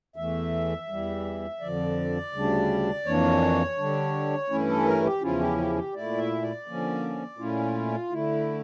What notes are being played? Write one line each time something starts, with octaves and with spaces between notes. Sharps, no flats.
E2 E3 A3 E5
E2 E3 G3
F2 D3 F3 D5
D2 C#3 G3 D4
F2 E3 A#3 D4 C#5
D3 G3 D4
G2 E3 A3 C#4 E4
A4
A#4
G4
E2 C#3 F3 C#4 E4 F4
G4
G4
G4
A#2 A3 E4 D5
E5
D5
D3 F3 A#3 C#4
A#2 A3 C#4 E4 F4
D3 A3 E4